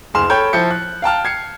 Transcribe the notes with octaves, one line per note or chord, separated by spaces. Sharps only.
F#1 D2 G#4 C6 F6 E7
A4 C#5 G5 B5 G6
F3 E4 G6 C#7
F#6
F5 G5 A5 F6
G#6 C7 C#7